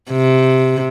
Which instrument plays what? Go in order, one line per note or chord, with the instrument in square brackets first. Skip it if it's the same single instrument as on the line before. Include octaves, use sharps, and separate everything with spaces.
[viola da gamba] C3